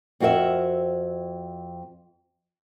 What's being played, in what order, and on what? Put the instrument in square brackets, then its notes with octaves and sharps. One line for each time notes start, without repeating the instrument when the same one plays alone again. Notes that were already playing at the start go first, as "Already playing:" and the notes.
[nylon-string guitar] F2 C4 F#4 A#4 E5